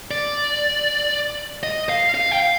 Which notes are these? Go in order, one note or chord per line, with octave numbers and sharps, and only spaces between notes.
D5
D#5
F5
F5
G5
F5